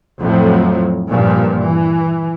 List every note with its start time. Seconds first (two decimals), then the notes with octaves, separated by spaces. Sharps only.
0.20 F2 A2 F3 F#3
1.09 G2 A#2 F3
1.60 E3